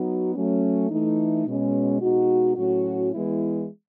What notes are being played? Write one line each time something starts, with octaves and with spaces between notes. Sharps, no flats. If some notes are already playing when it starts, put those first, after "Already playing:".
Already playing: F#3 B3 D#4 F#4
F#3 A3 C#4
E3 A3 D#4
B2 G#3 C#4
B2 G#3 D#4 F#4
A2 F#3 C#4 F#4
E3 G#3 B3 E4